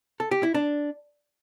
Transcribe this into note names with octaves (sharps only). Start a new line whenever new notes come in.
A4
G4
E4
D4